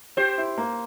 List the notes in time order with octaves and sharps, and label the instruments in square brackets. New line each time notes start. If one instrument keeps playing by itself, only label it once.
[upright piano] G4 [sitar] C5
[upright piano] E4
A#3